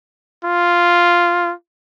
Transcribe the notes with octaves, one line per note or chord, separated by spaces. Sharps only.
F4